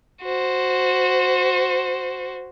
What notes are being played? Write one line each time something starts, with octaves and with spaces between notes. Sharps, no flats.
F#4 C5